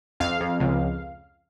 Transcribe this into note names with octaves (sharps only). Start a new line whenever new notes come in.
F2 F5
F2
C#2